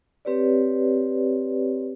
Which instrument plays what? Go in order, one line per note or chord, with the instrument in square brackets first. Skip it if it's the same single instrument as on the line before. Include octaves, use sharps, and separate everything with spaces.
[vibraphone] C4 G4 B4 C#5 D5